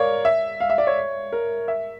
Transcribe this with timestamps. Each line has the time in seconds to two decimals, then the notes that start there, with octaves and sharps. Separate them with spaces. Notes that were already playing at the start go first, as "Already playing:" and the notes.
Already playing: A#4 C#5 D5 F5
0.25 E5
0.60 F5
0.70 E5
0.78 D5
0.87 C#5
1.32 A#4
1.68 E5